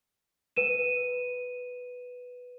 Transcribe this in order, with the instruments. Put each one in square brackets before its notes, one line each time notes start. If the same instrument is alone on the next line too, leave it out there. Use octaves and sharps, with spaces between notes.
[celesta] B4 D#7 E7